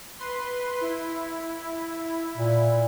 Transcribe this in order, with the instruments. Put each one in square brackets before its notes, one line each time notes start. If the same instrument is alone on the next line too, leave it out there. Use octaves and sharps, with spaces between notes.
[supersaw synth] B4 C6
E4
[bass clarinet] A#2